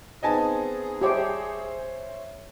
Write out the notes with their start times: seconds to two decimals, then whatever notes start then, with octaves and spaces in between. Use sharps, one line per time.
0.23 B3 C4 D#4 G#4 D#5 G#5 A5
1.01 G4 C5 C#5 E5